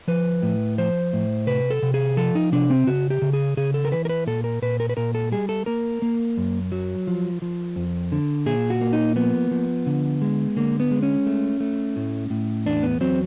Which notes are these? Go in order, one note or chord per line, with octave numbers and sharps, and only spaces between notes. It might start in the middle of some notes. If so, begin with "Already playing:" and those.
F3 B4
A2
F3 C5
A2
C3 B4
A4
C3
G#4
F3 A4
D#4
C3 D4
C4
C#3 F#4
G4
C#3
G#4
C#3 G#4
A4
A#4
E3 B4
A#4
B4
A#2 A4
A#4
A#2 B4
A#4
B4
A#2 A#4
A4
G3 G#4
A4
A#3 A#4
A#3
F#2
F#3
F3
F3
F2
D3
A#2 G#4
F#4
A#3
D#4
F3 B3
F3
D3
G#3
D3 A#3
B3
G#3
C#4
A3
A3
A2
A2
E2 D4
B3
F#3 C4